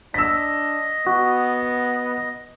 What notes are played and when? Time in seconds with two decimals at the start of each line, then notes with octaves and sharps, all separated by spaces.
0.14 D4 D#5 E6 B6
1.07 B3 F#4